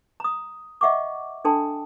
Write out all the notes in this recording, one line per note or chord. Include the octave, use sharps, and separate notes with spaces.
A#5 D#6
D#5 E5 F#5 C#6 D6
D4 A4 G5 A5 C6